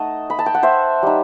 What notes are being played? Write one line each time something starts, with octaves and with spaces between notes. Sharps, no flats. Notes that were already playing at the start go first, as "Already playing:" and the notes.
Already playing: A3 D#4 D#5 F#5 A5
B5
A5
G5
F#5
C5 E5
G3 D#4